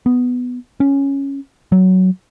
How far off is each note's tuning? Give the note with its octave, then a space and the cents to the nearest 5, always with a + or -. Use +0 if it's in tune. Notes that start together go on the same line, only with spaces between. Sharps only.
B3 +5
C#4 -5
F#3 +10